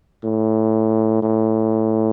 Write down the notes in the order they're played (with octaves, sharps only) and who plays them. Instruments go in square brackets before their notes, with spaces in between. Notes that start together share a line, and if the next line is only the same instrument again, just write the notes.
[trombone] A2
A2